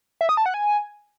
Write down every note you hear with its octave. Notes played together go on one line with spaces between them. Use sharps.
E5
D#6
A5
F#5
G#5